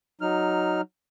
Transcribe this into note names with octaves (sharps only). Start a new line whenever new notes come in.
F#3 D#4 F6